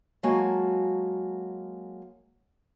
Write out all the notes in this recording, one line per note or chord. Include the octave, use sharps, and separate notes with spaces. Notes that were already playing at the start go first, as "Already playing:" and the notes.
F#3 G#3 A#3 F#4 G#5 A5